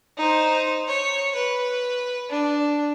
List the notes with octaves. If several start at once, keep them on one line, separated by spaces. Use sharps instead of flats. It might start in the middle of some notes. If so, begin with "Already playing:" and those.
D#4 C5
C#5
B4
D4